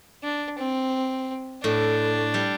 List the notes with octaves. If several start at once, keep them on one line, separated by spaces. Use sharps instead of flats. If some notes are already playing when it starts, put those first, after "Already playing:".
D4
C4
A2 D4
G3